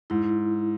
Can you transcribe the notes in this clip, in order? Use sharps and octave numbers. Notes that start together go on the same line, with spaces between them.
G#2 E4